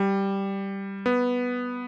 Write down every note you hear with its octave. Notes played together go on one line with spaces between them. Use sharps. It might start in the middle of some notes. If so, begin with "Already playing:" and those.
Already playing: G3
B3